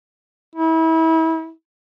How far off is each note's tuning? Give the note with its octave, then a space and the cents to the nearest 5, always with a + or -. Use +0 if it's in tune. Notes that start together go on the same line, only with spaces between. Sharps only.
E4 -30